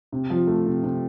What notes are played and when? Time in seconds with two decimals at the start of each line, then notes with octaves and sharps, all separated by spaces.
0.12 C3
0.30 F3
0.47 A3
0.66 C3
0.83 C3